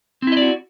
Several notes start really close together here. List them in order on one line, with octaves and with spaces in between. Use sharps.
C4 E4 D#5 D5 F#4